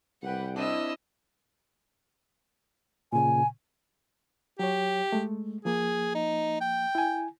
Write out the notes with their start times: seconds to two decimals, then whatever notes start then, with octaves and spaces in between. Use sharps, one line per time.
0.23 C2 G3 B4 F#5 G5
0.56 C4 D4 E4 D#5 E6
3.13 A#2 C#3 G#5
4.59 F#3 G4 C#5
5.12 G#3 A3
5.65 F3 A#3 G#4
6.15 D#4
6.61 G5
6.95 E4 G#5